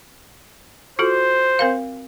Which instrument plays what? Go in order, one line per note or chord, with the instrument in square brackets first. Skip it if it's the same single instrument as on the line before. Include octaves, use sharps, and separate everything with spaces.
[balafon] F4 F#4 A4 [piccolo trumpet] C5
[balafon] C4 A#4 F5